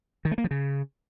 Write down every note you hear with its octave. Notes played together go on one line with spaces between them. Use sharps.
D#3
A3
A#3
F3
C#3